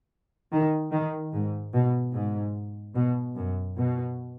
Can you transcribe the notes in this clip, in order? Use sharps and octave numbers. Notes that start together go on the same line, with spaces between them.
D#3
D#3
G#2
B2
G#2
B2
F#2
B2